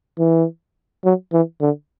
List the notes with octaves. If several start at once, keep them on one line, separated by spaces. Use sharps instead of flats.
E3
F#3
E3
D3